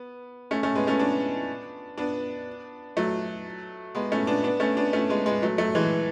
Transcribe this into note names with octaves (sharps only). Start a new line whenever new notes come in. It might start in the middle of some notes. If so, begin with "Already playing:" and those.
Already playing: B3
A3 C#4
A3 C#4
G#3 B3
A3 C#4
B3 D4
B3 D4
F#3 A3
G#3 B3
A3 C#4
B3 D4
B3 D4
A3 C#4
B3 D4
A3 C#4
G#3 B3
G#3 B3
F#3 A3
F#3 A3
E3 G#3